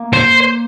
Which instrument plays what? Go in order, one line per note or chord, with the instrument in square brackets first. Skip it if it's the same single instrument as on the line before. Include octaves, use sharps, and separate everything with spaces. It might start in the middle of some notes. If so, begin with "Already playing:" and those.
Already playing: [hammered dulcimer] A#3
[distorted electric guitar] C5